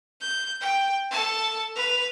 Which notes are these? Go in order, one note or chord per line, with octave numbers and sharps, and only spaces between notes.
G6
G5
A4 A5
B4 F7